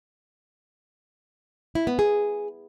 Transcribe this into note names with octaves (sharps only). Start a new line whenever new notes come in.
E4
B3
G#4